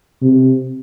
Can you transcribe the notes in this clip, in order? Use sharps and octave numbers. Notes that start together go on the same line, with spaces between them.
C3